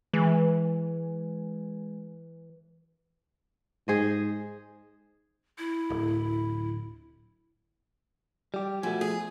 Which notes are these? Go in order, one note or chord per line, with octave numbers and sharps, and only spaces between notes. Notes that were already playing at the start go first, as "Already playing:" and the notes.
E3 G#3
G#2 G#4 C5 D#5
E4
D1
G3 G4
B2 F3 A3 G#5
G#4